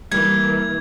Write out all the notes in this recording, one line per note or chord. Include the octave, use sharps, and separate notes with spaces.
E3 G3 A#3 G#6